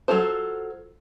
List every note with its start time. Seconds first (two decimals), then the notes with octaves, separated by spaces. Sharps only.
0.08 F#3 A#3 F4 A4 C5